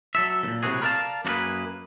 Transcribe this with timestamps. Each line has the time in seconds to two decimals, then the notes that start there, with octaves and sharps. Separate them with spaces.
0.15 F#3 A4 E5
0.43 E2 A#2
0.63 A2 C3 F3 F#3 F#4 G#4
0.81 A#4 B4 D5 E5 F5 A5
1.25 F#2 A#3 F#4 G#4 B4